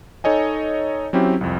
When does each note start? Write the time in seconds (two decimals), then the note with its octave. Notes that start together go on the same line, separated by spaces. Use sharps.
0.24 D#4 A4 C#5 D#5 G#5
1.13 F#3 C4 C#4 E4 G4
1.41 C2 F2